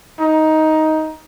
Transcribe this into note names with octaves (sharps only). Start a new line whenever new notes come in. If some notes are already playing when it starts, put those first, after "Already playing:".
D#4